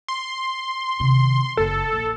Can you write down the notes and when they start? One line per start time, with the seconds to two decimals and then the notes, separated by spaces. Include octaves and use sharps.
0.08 C6
1.00 C3 D#3
1.57 F#1 A4
1.93 A#1